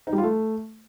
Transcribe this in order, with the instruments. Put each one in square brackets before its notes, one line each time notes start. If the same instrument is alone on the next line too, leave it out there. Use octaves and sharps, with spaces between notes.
[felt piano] D#4
G3
F4
A3